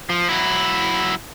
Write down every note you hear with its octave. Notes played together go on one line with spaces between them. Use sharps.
F3
F#3 E4